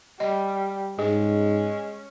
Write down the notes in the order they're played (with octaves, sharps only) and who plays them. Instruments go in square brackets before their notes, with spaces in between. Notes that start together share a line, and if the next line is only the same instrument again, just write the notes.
[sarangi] G3 [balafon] D#5
[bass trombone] G#2 [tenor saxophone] G#3 [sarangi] C#4 [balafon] G#4